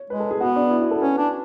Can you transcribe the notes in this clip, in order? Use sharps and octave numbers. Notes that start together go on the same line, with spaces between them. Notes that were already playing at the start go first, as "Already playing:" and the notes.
Already playing: C#5
G#3 B4
A4
G#4
B3 F#4
D4
E4
F#4
A4
C#4 B4
D4